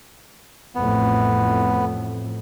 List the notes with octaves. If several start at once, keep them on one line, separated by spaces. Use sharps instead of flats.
A1 F2 A2 B3